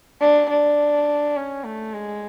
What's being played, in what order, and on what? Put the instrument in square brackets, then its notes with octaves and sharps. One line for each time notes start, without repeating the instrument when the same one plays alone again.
[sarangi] D4
D4
C#4
A3
G#3